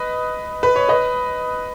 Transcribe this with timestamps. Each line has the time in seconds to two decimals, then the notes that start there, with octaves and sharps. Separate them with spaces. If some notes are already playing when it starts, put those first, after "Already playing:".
Already playing: B4 D#5
0.63 B4
0.76 C#5
0.89 B4 D#5